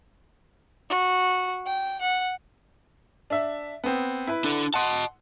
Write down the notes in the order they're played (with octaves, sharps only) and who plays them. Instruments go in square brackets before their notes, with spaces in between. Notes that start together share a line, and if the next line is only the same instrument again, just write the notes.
[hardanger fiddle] F#4
G5
F#5
[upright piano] D4 E5
B3 C4
E4 B4
[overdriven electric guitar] D4 A4
[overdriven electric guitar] D#5 A5 [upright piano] F#5 C6